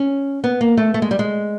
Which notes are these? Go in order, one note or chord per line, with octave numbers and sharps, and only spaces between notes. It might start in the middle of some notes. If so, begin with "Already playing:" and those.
Already playing: C#4
B3
A#3
A3
A3
G#3
G3
G#3